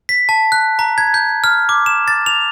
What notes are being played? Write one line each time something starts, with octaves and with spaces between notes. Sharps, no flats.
B6
A5
F#6
A#5
G#6
G6
F6
D6
E7
A6
F7